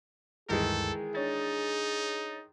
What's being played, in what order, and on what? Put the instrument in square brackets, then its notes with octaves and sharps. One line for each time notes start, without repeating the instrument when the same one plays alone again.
[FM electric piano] D2 G2 G3 [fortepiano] D#3 E3 G#3 [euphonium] G#4 [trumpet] A4
[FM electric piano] D4 C#5 A6 [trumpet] D#4